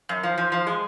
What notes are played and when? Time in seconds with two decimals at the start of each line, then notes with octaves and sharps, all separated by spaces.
0.09 F#2
0.23 F3
0.38 F3
0.52 F3
0.67 G#3